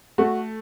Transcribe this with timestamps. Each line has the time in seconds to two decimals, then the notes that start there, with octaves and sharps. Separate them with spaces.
0.18 A3 F#4